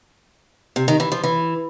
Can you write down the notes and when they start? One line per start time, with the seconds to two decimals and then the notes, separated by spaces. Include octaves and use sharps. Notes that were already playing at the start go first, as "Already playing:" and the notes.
0.76 C3
0.88 D#3
1.00 E3
1.12 F3
1.24 E3